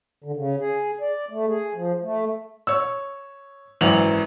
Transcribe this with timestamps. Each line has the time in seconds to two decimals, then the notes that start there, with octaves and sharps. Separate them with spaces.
0.24 D3
0.36 C#3
0.60 G#4
1.01 D5
1.31 A3
1.48 G#4
1.75 F3
2.03 A3
2.67 C#5 E6
3.81 G#1 F#2 E3 F7 F#7